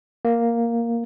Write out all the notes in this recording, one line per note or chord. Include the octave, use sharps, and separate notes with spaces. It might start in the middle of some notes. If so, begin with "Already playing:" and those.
A#3